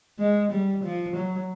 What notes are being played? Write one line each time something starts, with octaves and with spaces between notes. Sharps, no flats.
G#3
G3
F3
F#3